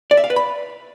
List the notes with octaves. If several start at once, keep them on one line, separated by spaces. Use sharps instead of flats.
D5
E5
F5
B4
B5